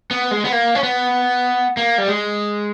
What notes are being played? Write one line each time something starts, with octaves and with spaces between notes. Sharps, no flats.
B3
G#3
B3
A#3
C#4
B3
A#3
G3
G#3